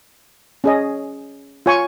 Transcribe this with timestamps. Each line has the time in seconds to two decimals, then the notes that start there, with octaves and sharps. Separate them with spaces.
0.64 C#4 G#4 D#5
1.66 F4 C#5 G#5 C#6